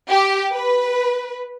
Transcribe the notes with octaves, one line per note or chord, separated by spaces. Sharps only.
G4
B4